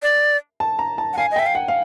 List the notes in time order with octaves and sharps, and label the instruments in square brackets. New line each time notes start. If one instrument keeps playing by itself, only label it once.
[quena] D5
[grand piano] A5
A#5
A5
[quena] F#5
[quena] F5 [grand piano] G#5
[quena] D#5
[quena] E5 [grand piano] G5
[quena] F5
[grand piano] F#5
F5